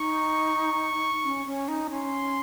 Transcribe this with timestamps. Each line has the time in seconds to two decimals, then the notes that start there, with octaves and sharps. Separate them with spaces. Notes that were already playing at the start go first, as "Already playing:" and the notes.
Already playing: D#4 C#6
1.24 C#4
1.46 C#4
1.68 D#4
1.90 C#4 C6